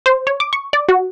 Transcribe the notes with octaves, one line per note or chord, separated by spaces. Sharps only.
C5
C#5
D6
C#6
D5
F#4